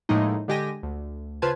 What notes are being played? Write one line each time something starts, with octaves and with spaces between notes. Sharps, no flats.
A2 F3 G#3 A#3 D#4
D3 G#3 G4 G#5 A#6 D#7
D2
C#3 F4 B4 C5 A5 G#6